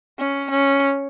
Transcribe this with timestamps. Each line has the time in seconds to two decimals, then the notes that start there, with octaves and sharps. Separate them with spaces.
0.19 C#4
0.51 C#4